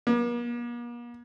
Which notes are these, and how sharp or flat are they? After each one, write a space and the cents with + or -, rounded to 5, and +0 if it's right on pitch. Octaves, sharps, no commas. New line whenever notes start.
A#3 +45